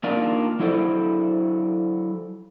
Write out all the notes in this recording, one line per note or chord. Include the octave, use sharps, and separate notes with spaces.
A#3 D4 D#4 F4 A#4 D5
F#3 E4 A4 C5 D5